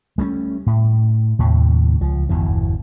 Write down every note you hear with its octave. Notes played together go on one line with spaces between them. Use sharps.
G3 A3 B3 C#4
A2
D#2 A2 C3
C#2 F3
G1 E2 B2 E3